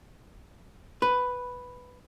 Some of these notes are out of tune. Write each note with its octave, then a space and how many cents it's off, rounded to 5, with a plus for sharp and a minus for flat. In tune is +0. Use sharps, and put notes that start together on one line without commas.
B4 +5